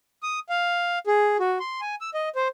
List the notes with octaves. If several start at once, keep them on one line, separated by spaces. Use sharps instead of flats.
D#6
F5
G#4
F#4
C6
G#5
E6
D#5
C5